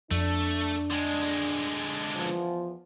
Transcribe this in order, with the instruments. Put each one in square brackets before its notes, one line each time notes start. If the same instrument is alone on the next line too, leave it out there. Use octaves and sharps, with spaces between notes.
[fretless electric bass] F2 [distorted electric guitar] A3 [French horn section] D4
[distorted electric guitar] D3 G#3
[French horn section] E2 F3